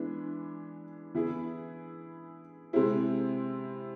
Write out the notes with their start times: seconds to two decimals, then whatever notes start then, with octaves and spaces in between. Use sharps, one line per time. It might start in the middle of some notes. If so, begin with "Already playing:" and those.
Already playing: E3 G#3 B3 D4
1.14 E3 B3 E4 G#4
2.73 C3 G#3 C4 E4